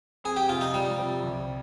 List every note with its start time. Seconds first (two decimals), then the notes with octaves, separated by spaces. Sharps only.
0.24 F2 G#4
0.37 G4
0.49 C3 F3 F4
0.61 D#4
0.74 F2 G3
0.99 C3 F3
1.24 C2